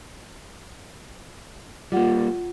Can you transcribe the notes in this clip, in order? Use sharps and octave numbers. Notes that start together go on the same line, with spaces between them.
G3 A#3 F4 F#5